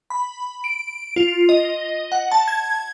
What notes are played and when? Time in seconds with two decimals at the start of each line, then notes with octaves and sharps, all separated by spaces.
0.10 B5
0.64 D7
1.16 F4
1.49 D#5
2.12 F#5
2.32 A5
2.48 G#6